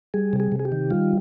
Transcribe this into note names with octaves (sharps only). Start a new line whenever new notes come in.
G3 G#4
C3
G#4
C3
G#4
G4
D#3
G3 F4